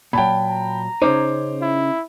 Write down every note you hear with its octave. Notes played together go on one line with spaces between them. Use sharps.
A#2 F#3 G5 A5 B5
A#5
C#3 C#4 D#4 C5 D6
E4